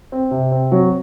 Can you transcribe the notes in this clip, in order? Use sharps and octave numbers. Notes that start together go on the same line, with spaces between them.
C4
C3
C4
F#3